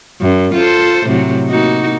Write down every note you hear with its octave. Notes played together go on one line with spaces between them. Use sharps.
F#2
F4 A4 C5
A2 C3 F#3
A#3 D#4 F#4